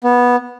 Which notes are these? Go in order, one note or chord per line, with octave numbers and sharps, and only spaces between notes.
B3